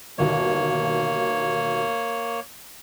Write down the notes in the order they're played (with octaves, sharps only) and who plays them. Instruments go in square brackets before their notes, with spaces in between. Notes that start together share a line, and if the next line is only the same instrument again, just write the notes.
[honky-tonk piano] G1 D#2 B2 [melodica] A#3 C#5